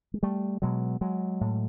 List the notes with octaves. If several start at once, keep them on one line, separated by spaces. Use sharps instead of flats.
G#3
G3 A3
B2 F#3 G#3
F#3 G#3
A2